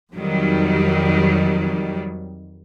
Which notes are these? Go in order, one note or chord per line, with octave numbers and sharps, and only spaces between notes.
F2 D#3 F#3 G3